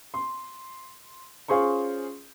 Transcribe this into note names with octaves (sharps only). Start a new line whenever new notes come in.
C6
C#4 F4 G#4 C5 C6 C#6